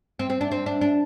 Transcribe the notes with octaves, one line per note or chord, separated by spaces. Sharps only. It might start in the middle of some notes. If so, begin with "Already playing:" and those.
C4
C4
D4
C4
D4
D4